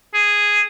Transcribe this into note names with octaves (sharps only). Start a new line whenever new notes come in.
G#4